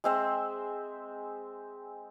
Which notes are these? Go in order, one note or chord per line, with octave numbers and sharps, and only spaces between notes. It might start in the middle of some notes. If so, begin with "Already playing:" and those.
G#3 C4 E5